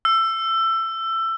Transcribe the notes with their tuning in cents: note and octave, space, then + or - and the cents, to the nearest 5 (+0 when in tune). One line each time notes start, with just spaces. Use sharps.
E6 +20